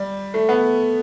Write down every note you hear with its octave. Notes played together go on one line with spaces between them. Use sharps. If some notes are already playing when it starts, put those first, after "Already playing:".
Already playing: G3
A3
B3